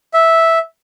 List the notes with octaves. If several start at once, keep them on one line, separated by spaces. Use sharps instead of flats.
E5